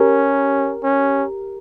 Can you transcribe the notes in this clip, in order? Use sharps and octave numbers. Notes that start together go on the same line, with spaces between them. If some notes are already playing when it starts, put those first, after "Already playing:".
Already playing: C#4 G4 A#4
C#4